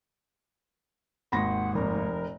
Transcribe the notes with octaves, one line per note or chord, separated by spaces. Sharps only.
G#1 D#2 F#5 B5 C6 A#6
F1 A#4